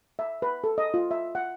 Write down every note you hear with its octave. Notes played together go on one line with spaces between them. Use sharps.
E5
B4
A4
D#5
F4
E5
F#5